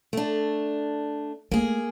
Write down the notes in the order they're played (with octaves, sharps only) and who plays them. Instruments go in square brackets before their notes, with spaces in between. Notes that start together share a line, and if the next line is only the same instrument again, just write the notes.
[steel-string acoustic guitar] A3 D4
[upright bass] A3 [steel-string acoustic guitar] A#3 G#4